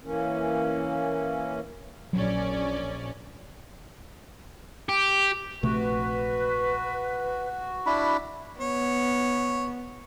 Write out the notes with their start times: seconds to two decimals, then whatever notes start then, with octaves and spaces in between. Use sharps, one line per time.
0.03 E3 A#3 C#4
2.13 A#1 F#3 C#4 D5
4.89 G4
5.63 A#1 C3 A3 F#4 B4
7.86 D4 E4 B5
8.61 B3 C#5